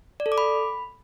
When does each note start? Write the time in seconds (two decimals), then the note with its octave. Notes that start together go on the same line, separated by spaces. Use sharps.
0.20 D5
0.26 A4
0.32 D6
0.38 B5